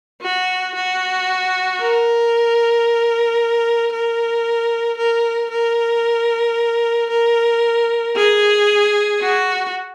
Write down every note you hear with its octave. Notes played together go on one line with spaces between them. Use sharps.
F#4
F#4
A#4
A#4
A#4
A#4
A#4
G#4
F#4